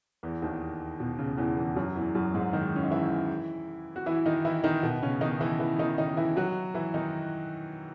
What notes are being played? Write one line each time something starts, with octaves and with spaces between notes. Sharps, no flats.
E2 E3
D#2 D#3
B2
C#3
E2 E3
E2 E3
F#2 F#3
E2 E3
F#2 F#3
G#2 G#3
D#3 D#4
C#4
D#4
E3 E4
F#4
E3 E4
D#3 D#4
E3 E4
D#3 D#4
B2 B3
C#3 C#4
D#3 D#4
E3 E4
E3 E4
D#3 D#4
D#3 D#4
E3 E4
F#3 F#4
E3 E4
D#3 D#4